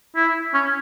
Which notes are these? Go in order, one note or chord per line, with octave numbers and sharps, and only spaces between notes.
E4
C#4